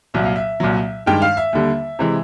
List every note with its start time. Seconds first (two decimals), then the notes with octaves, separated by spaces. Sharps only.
0.14 C2 A#2 F#3 E5
0.25 F5
0.36 E5
0.60 C2 A#2 F#3
1.06 G2 D#3 G#3 G5
1.22 F5
1.37 E5
1.53 D#2 D3 G3
1.99 C3 E3 G#3